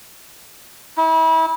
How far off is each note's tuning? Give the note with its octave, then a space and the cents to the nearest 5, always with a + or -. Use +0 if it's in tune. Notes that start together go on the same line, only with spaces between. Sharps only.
E4 -35